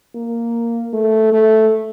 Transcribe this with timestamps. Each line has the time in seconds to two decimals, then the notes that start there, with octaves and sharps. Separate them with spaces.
0.15 A#3
0.93 A3
1.32 A3